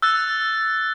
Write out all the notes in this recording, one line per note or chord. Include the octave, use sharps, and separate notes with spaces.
E6 F#6 A6